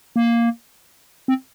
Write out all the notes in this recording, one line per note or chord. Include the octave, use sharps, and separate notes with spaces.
A#3
C4